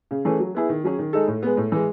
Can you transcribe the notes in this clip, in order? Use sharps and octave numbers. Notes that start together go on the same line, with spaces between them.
C#3
E3 A3 C#4 G#4
F#3
B3 E4 G#4
D#3
F#3 C#4 G#4
D#3
G#3 D#4 A4
A2
G#3 B3
A2
E3 G#3